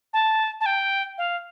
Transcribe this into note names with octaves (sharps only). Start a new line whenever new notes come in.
A5
A5
G5
F5